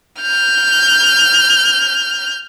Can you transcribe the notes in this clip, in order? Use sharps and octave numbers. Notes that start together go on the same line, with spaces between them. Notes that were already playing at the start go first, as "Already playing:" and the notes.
F6 G6